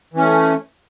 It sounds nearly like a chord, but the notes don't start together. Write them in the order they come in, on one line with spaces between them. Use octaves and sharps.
E3 C#4 A3